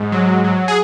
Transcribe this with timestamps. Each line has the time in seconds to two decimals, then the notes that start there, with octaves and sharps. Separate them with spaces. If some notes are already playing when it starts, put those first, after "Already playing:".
Already playing: G#2
0.12 F#3
0.44 F#3
0.68 G#4